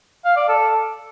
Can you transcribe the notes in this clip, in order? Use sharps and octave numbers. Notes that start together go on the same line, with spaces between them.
F5
D5
A4